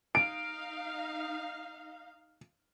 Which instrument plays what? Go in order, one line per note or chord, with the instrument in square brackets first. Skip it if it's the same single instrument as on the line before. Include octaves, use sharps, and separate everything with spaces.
[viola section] D#4 F5 [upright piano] D7